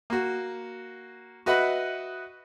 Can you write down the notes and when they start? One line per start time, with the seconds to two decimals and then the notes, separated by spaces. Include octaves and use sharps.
0.10 A#3 F#4
1.46 F#4 B4 D#5 E5 F#5 B5